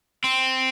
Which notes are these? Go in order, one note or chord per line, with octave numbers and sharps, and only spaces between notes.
C4